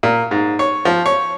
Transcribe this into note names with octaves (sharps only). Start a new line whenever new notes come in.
A#2
G#2
C#5
F3
C#5